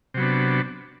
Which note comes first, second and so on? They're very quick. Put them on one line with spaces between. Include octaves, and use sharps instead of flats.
C3 F#3 B3 D4